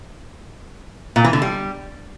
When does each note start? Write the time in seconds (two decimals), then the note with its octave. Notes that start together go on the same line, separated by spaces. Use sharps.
1.16 A#2
1.24 E3
1.33 D3
1.42 G3